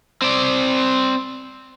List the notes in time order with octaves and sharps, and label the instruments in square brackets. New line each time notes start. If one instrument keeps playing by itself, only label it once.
[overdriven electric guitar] C4 D5